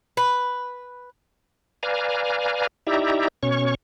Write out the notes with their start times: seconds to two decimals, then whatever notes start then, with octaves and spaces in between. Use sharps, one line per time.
0.17 B4
1.83 B4 D5 F5 G#5 A#5
2.87 D#4 E4 G4 D5 E5 A#5
3.43 B2 C#4 C#5 C#6